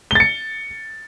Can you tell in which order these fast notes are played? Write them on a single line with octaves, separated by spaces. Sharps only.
G7 A6 C#7